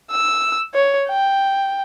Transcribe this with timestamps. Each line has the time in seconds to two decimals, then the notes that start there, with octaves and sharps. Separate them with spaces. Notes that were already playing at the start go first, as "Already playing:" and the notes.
0.11 E6
0.74 C#5
1.09 G5